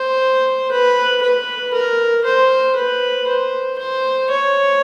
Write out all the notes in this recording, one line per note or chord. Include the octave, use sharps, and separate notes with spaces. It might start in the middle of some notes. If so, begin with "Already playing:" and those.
Already playing: C5
B4
B4
A#4
C5
B4
C5
C5
C#5